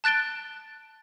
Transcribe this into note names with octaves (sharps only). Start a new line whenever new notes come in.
A5 F#6 A6 D7 G7